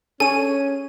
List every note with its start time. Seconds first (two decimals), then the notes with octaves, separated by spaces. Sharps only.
0.20 C#4 D4 G#4 A4 C#5 G#5 D#7